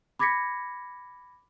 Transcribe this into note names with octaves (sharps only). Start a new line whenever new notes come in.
B5 D6 G#6 A#6 B6 C#7